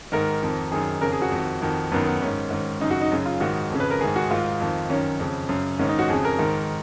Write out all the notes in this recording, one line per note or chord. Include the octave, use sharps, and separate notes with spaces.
G#2 D#3 A#4
F2 D#3
F#2 D#3 G#4
F2 C#3 A#4
G#4
F#4
F2 D#3
F2 D#3
F#2 D#3 B3
B3
G#2 D#3 C#4
G#2 D#3
F#2 C#3 D#4
F#4
D#4
F#2 C#3
F4
G#2 D#3 F#4
F2 C#3
B4
A#4
G#2 D#3 G#4
F#4
G#2 D#3 F4
F2 D#3
F#2 D#3 C#4
F2 C#3
F#2 C#3
G#2 D#3 C#4
D#4
F#4
F2 C#3 G#4
A#4
G#2 D#3